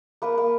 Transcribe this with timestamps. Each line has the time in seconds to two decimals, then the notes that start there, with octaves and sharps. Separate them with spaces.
0.22 A#3 B4
0.38 A#3